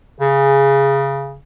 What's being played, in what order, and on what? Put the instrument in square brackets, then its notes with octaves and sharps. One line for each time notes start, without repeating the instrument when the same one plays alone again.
[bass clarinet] C#3 [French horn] G#4